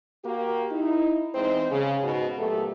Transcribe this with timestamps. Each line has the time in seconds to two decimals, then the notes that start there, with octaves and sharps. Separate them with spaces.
0.25 A#3 F#4 G4
0.72 D#4 E4
1.35 E2 E3 G#3 C4 D#4 C5
1.71 C#3
2.03 G#2 B2
2.39 A#2 F#3 A3 B3 G4 A4